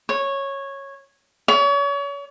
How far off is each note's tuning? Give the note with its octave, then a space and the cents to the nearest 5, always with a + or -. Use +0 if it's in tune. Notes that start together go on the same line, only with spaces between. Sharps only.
C#5 -10
C#5 +35